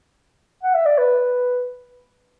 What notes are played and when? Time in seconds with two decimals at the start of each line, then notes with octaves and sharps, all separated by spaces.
0.63 F#5
0.74 E5
0.86 D5
0.98 B4